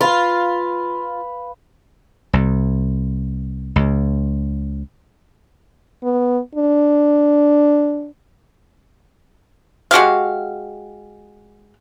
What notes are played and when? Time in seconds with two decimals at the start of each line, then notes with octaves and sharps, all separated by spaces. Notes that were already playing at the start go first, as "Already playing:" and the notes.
0.01 F4 B4 F5 B5
2.33 C2
3.76 C#2
6.03 B3
6.55 D4
9.91 G#3 F#4 G4 F5